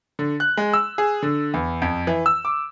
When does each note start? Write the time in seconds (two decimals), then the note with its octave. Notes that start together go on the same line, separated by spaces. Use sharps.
0.19 D3
0.40 F#6
0.57 G#3
0.74 E6
0.98 G#4
1.23 D3
1.54 E2
1.82 F2
2.07 E3
2.26 E6
2.45 D6